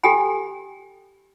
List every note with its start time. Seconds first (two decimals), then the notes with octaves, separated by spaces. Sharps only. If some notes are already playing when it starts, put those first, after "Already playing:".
0.03 G4 A4 G5 G#5 B5